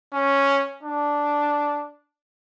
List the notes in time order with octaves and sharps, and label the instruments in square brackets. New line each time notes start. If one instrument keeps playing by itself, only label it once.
[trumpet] C#4
D4